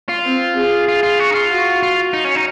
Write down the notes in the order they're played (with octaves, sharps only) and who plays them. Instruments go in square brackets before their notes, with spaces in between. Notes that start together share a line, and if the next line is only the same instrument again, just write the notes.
[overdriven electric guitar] F4
[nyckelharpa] C4
G#4
[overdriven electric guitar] F4
F4
F#4
D#4
F4
[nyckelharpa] F#4
[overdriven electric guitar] F4
D#4
C#4
D#4